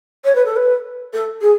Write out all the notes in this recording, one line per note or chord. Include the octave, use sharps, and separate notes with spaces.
C#5
B4
A4
B4
A4
G#4